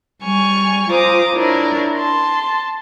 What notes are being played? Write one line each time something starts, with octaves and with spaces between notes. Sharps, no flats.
G3 G#5 C#6 F6
F4 C5 A#5 D6 D#6
D4 E4 A#4 C#5
A5 C6